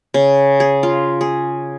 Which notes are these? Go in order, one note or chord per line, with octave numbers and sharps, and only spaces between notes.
C#3
G#4
F4
G#4